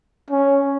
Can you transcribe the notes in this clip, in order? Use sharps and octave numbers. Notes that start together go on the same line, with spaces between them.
C#4